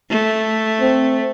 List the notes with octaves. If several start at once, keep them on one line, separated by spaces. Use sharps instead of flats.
A3
C4